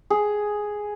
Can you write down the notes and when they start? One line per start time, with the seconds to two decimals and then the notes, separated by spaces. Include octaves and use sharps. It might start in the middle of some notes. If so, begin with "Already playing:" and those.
0.10 G#4